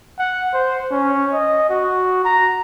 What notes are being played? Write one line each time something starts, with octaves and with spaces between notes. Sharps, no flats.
F#5
C5
C#4
D#5
F#4
A#5